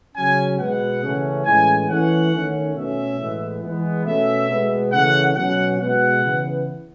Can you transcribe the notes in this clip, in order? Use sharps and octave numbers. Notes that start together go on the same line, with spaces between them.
C#3 F#3 C#4 G#5
B2 G#3 B3 F#5
C#3 E3 A3 C#4
A2 E3 G#3 C#4 G#5
E3 A3 C#4 F#5
D#3 A3 C#4
B2 A3 C#4 E5
A2 E3 G#3 B3
E3 G#3 B3
B2 A3 C#4 E5
B2 G#3 B3
C#3 E3 A3 C#4 F#5
B2 F#3 C#4 F#5
B2 G#3 B3 F#5
C#3 E3 B3